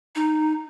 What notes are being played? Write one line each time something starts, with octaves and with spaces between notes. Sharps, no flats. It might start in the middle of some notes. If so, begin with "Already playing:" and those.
D#4